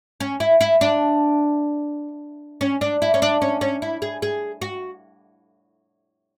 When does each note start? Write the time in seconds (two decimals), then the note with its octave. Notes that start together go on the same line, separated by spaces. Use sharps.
0.20 C#4
0.40 E4
0.61 E4
0.81 D4
2.61 C#4
2.81 D4
3.02 E4
3.14 C#4
3.22 D4
3.42 C#4
3.61 C#4
3.82 E4
4.02 G#4
4.22 G#4
4.62 F#4